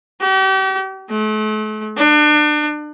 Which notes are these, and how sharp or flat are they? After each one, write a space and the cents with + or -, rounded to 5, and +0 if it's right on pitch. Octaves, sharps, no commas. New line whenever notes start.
G4 -40
A3 -40
D4 +35